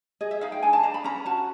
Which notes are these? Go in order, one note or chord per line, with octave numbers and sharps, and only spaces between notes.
G#4 D#5
E5
D#4 F5
G5
D4 G#5
A5
D4 A#5
B5
C#4 A#5
F#4 A5